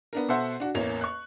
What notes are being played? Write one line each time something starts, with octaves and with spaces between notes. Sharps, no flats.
B3 D4 A#4
B2 A4 C5 E5 F#5 C6
D4 F#4
A1 E2 A#3 C#5 F7
C#6 F#6